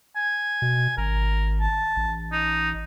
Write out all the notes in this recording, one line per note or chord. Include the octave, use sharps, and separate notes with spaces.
G#5
B2
G#1 A#4
A5
A1
D#4